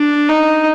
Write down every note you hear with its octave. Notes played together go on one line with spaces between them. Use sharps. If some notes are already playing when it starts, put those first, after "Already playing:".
Already playing: D4
D#4